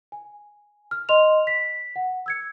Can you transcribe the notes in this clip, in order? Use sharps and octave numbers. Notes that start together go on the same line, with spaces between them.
G#5
F6
D#5 C6 F6 F7
B6
F#5
E6 G#6 C#7